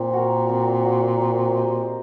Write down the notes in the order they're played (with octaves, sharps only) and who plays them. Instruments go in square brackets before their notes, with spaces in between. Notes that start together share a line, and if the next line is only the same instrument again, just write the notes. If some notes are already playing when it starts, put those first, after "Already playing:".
Already playing: [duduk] A#2 [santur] C4
[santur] F#4 A#4
C4
F#4 A#4
C4
G4 C5 D#5